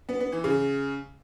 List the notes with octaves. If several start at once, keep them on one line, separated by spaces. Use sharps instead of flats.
B3
B3
E3
C#3